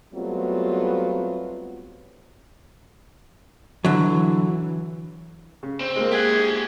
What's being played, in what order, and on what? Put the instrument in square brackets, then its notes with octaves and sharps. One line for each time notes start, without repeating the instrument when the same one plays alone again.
[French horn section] F#3 G3 A3 B3 C4 F4
[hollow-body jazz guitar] D3 F#3 [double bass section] E3
[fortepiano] C#3
[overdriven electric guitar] C4
[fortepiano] G#3 A#3
[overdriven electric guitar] G4 F#5 [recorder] G#4